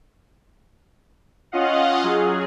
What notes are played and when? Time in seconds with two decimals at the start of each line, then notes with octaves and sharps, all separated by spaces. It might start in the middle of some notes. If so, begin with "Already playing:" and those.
1.52 C#4 F4 D#5 F5 F#5
2.03 F#3 G#4